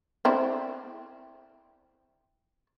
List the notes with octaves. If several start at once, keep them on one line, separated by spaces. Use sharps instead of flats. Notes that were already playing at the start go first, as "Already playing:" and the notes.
C4 D4 E4